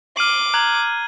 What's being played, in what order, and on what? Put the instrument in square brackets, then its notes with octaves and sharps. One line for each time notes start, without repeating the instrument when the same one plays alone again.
[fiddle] D6 [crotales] F6 D#7 F#7 [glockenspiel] C7
[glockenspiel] A#5 [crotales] F#6 G#6 F#7